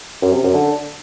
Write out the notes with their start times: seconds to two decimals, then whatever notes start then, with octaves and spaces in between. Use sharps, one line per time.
0.22 F#2
0.33 C3
0.43 F#2
0.54 D3